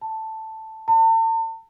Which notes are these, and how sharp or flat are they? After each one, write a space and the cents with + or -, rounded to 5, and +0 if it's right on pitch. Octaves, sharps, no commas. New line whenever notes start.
A5 +5
A5 +40